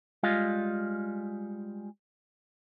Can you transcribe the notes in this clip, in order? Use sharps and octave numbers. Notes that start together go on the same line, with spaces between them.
G3 G#3 F4 D#5 F5